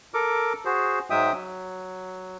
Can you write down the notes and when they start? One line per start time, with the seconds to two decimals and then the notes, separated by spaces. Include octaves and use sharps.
0.14 A4 A#4 D6
0.65 F#4 G#4 C5
1.10 G#2 F#3 G#3 E5 G5 D#6
1.33 F#3